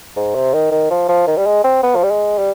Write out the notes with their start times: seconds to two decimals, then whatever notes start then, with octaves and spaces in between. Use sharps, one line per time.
0.16 G#2
0.35 C3
0.54 D#3
0.72 D#3
0.90 F3
1.09 F3
1.27 D#3
1.37 G3
1.46 G#3
1.64 C4
1.83 B3
1.95 F3
2.03 G3
2.11 G#3
2.38 G3